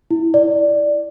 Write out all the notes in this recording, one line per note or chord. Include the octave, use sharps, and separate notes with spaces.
E4
D5